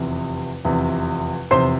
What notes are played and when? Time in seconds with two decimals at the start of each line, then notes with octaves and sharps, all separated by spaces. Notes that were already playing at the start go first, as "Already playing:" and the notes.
Already playing: F1 E2 C3
0.65 F1 E2 C3
1.51 F1 E2 C3 C5 C6